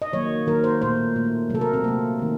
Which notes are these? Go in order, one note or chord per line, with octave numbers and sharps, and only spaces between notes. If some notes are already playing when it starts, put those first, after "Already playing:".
D#5
D#3 F#3 A#3 C#5
D#3 F#3 A#3 A#4
C5
A#2 A3 C5
A#2 A3
C3 F#3 A3 A4
A#4
C4
C3 F#3 A3 A#3
D#3 A3